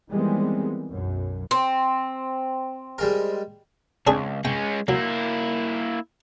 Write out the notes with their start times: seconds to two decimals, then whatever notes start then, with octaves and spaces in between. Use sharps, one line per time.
0.10 D#3 E3 G3 G#3 B3 C4
0.89 B1 F#2
1.51 C4
2.98 G3 G#3 A#4
4.07 C#2 C4 D4 G#4
4.45 G#3 C#4 G5
4.88 F#3 A#3 E4